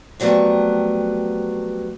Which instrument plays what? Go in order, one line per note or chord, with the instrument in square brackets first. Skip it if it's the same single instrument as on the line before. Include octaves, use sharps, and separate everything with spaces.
[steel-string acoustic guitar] F2 F#3 G3 A3 B3